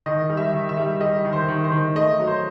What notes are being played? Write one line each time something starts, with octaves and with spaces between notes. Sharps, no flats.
D#3 D#5
G3
E5
D#3
E5
G3
G3 D#5
D#3
C5
D#3
C5
D#3
A3 D#5
F#3
C5